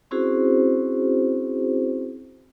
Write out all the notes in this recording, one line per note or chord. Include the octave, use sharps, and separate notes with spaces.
C4 C#4 E4 F#4 G#4 C5